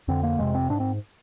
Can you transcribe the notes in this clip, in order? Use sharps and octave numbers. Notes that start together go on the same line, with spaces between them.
F2 D3 C4
A#3
F2 C3 G#3
C4
G#2 D4
C4